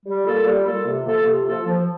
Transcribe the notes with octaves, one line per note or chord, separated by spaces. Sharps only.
G3
A#3 F4 A4
G3
A#3 F4 A4
C3
F3 A#3 F4 A4
C3
F3 A#3 F4 A4
F3